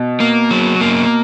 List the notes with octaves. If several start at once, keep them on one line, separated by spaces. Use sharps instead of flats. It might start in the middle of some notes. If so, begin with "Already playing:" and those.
Already playing: B2
A#3
F#3
A#3